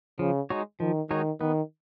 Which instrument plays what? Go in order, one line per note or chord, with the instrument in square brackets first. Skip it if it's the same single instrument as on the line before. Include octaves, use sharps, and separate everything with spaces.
[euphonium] C#3 [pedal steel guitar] F3
[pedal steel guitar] G#3 D#4 F#4 C#5
[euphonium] D#3 [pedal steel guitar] F3
[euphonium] D#3 [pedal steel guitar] G#3 D#4 F#4 C#5
[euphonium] D#3 [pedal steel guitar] B3